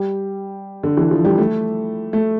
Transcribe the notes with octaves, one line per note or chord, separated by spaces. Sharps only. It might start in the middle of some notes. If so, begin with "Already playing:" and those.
Already playing: G3
D3
E3
F3
G3
A3
A3